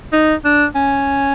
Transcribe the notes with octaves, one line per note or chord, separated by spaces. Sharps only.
D#4
D4
C#4